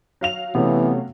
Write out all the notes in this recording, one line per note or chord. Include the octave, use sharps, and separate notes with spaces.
F#3 F5 F7
C3 E3 A3 B3 C#4